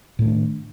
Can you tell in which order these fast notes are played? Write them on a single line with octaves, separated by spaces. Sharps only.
A2 A3 D#3 D4